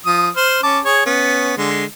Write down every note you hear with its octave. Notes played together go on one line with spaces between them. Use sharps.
F3 D#6
C5 F6
C#4 A5 D6
G#4 C#5
B3 C#4
D3 G#3